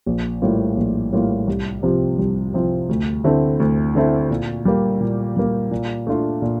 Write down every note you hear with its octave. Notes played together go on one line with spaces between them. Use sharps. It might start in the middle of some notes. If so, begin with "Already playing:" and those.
A#1
A2 G3 A#3 F4
A#1
A2 G3 A#3 F4
C2
C3 F3 C4 F4
C2
C3 F3 C4 F4
D2
D3 A3 C4 E4
D2
D3 A3 C4 E4
A#2
G3 A#3
A#2
G3 A#3
A#2
A3 D4 F4
A#2